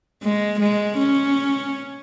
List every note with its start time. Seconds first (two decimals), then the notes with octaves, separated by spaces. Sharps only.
0.23 G#3
0.60 G#3
0.98 C#4